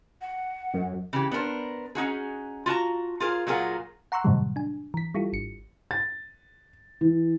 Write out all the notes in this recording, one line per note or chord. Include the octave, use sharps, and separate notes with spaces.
F#5
F#2
C#3 E3 G4
B3 D4 A#4 C5
C#4 D#4 F#4 G#4
F4 F#4 A5 A#5
F4 G#4 A#4 C5
A#2 F#3 F4 G#4 A#4 F#5
F#5 A#5 C6 C#6 E6 F#6
F#2 A2 C3 D#3 F#3 G3
D4 G#5
E3 B6
G3 E4 F4 G4 A4
G#1 C#7
A6
E3